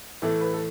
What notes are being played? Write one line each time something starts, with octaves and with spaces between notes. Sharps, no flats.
A2 E3 A3 A4
B4
A4